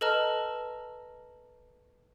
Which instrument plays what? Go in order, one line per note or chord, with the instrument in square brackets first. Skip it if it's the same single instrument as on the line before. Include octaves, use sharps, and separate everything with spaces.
[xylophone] A4 B4 D#5 A5 A#5 F6